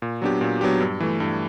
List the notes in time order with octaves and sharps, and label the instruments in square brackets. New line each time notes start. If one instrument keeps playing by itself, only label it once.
[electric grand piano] A#2
F#3 B3 D4 G4
A#2
F#3 B3 D4 G4
G2
E3 A3
G2